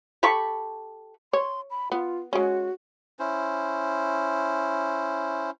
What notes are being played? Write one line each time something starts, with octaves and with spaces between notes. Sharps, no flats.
G4 A4 B5 C#6
C#5 C6
B5
B3 F4
G#3 C#4 F#4
C#4 E4 C5